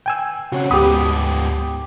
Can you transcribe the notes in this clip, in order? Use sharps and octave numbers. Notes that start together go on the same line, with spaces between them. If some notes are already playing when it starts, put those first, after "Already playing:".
G5 G#5 E6
C#3 C4 F#4 C#5 F#5
D2 G#2 B3 G4 B5 D#6